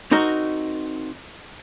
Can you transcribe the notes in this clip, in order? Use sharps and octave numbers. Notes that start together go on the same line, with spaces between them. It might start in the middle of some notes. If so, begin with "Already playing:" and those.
C4 D#4 F#4 A#4